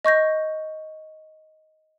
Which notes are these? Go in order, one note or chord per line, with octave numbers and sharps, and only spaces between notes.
D#5 C#6 G6 A#6